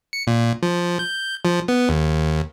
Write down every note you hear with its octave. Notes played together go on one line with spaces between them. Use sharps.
C#7
A#2
F3
G6
F3
B3
D#2